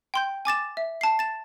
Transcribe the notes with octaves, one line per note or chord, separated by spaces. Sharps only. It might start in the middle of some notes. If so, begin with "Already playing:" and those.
G5 C6 G6
G#5 D6 A6 E7
E5
A5 C7
A6 E7